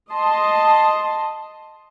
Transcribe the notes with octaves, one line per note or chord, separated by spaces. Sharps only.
D#5 A5 C6